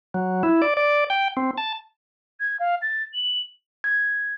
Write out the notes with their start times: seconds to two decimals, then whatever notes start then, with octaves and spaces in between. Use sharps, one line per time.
0.14 F#3
0.43 E4
0.62 D5
0.77 D5
1.10 G5
1.37 C4
1.58 A5
2.40 G#6
2.60 F5
2.82 A6
3.14 F#7
3.84 G#6